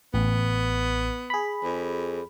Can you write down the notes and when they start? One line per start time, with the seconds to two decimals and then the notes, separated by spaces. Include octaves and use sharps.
0.14 A1 B3
1.30 G#4 B5
1.63 F2